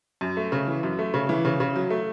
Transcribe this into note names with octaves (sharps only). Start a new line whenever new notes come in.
F#2
A3
C#3
E3
F#2
A3
C#3
E3
C#3
C#3
F#3
A3